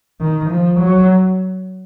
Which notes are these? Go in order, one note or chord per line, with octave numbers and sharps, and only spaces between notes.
D#3
F3
F#3